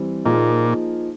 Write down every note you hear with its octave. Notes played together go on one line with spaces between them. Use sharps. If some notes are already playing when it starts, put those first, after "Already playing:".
Already playing: E3 G3 C4
A#2 F3 A#3 D#4 G#4